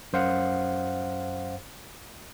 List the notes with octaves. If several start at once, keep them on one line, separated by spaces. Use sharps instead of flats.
F#2 C5 F5 F#5